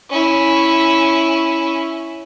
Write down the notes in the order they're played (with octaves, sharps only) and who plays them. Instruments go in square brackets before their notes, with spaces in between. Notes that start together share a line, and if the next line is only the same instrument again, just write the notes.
[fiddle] C#4 E4